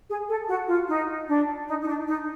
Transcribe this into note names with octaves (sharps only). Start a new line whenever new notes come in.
G#4
A4
F#4
F4
D#4
D4
D#4
D#4
D4
D#4